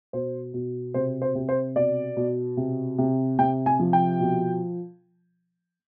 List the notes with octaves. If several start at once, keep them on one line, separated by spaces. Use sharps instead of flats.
B2 C5
B2
C3 C5
C5
C3
C5
B2 D5
B2
C3
C3
C3 G5
G#5
F3
G5
B2